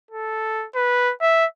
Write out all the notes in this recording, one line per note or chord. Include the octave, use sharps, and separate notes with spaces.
A4
B4
E5